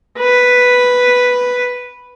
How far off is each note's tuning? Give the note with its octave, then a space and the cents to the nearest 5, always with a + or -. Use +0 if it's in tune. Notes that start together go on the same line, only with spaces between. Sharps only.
B4 +0